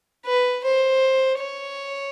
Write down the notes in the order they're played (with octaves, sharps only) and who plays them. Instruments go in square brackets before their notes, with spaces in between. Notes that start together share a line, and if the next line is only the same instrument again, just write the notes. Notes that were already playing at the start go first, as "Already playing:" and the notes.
[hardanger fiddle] B4
C5
C#5